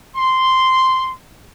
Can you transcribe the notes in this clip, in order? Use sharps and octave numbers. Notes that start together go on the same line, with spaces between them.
C6